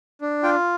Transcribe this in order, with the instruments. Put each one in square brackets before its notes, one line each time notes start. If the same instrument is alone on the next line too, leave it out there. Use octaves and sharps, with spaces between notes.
[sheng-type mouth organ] D4
F4 G5